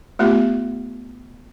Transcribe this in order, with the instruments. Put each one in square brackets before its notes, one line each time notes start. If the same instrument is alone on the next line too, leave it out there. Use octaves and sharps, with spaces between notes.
[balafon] A3 B3 F4 G4